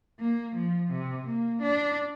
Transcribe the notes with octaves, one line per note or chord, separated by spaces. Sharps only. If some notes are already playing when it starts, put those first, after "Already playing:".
A#3
F3
C3
A#3
D4